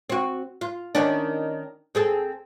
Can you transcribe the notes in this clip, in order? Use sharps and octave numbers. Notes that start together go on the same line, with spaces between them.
C4 F#4
F4
D#3 C#4 D4
C4 G#4 A4